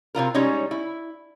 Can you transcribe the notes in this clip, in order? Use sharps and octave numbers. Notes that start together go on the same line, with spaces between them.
C3 E3 F4 A#4
G3 G#3 C#4 D#4 C#5
E4